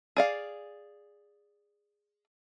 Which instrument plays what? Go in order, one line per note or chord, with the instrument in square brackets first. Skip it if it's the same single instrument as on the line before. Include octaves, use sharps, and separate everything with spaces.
[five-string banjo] G#4 D5 F5